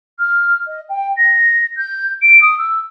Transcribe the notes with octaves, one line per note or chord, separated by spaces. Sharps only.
F6
D#5
G5
A#6
G6
D7
D#6
E6